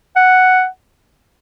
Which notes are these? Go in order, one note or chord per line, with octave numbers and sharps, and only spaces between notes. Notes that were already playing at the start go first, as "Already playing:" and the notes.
F#5